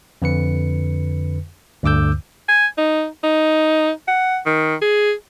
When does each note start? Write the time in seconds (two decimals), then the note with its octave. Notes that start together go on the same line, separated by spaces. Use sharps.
0.22 F2 D3 B4 C#7
1.83 D2 G2 D3 D6 E6 G6
2.49 G#5
2.78 D#4
3.24 D#4
4.08 F#5
4.46 D#3
4.81 G#4